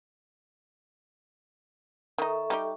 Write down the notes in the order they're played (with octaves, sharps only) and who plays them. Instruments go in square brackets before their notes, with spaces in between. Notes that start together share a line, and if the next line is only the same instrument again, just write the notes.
[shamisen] D#3 D#4 [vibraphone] A4 E5 C#6
[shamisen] G3 D#4 G4